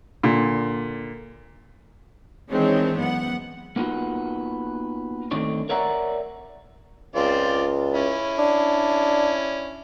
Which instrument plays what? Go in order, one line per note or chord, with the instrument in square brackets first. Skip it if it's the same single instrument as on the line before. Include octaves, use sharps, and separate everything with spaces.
[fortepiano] A#2 D3
[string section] D#3 E3 G#3 C4 D4 C#5
F#2 B3 F#5
[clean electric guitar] A#3 B3 D#4 F4 F#4
D#3 A3 C4 D4 D#4 C#5
A#4 C#5 D5 E5 F#5 A#5
[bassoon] C#2 [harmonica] C4 F4 D5
[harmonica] C#4 E4
[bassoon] D4